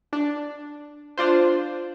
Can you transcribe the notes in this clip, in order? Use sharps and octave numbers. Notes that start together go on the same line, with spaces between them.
D4
D4 F4 C5